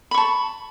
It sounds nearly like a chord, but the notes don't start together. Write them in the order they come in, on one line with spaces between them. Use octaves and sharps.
B5 C#6 A5